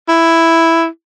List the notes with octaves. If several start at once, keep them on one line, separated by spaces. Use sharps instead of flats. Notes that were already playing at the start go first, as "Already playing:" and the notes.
E4